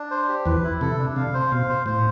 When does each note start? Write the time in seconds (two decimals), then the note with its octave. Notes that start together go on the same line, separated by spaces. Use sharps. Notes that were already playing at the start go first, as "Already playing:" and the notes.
Already playing: D4
0.11 C5
0.28 G4
0.46 E2 E3 B4
0.64 E4
0.81 C3 A4
0.99 D4
1.16 C3 F5
1.34 C5
1.51 B2 F5
1.69 C5
1.86 A2 C5